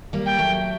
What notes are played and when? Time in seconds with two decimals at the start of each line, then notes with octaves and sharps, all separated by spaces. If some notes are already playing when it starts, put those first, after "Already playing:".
0.13 G3 A#3
0.26 G5
0.38 F#3 A3